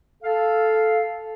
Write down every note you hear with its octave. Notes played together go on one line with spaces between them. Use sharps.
A4 F5